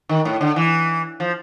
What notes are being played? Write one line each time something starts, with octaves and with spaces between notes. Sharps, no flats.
D#3
A2
D3
E3
F3